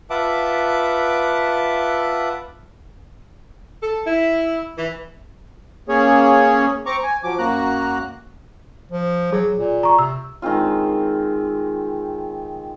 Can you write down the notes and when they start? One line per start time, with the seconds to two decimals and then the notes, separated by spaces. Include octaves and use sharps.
0.10 F4 B4 E5 F#5 A5 D6
3.81 A4
4.06 E4
4.77 E3
5.89 A#3 C#4 G#4 C#5
6.86 C4 A#5 C#6 D6
7.03 G#5
7.23 F3 F#3 D6
7.39 F#2 A#3 F#4 A#5 F#6
8.92 F3
9.32 F#3 G#4
9.56 A#2
9.83 A#5 C#6
9.99 C3 E6
10.42 D#3 G#3 C4 F4